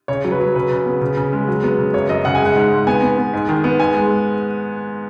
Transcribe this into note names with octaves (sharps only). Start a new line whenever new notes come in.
C#3 C#5
F#3
B4
F#3
C#3 B4
C#3
B3
C#3
C#3
G#3
F#3
B3
C#3
F#2 C#5
F#2 D#5
C#3 F#5
G#5
G#3
F#5
G#2
G#2
B3 G#5
B3
B3
G#2
D#3
B3
G#2 G#5
G#3
G#3